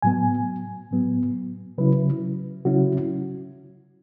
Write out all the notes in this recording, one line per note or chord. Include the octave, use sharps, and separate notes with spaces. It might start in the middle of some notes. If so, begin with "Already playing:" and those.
A2 F#3 B3 G#5
A2 F#3 B3
C#3 F#3 C#4 E4 B4
C#3 F#3 C#4 E4 F#4